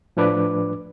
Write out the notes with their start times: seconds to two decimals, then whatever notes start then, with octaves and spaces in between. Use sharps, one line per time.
0.17 A2 F3 D4 B4 D6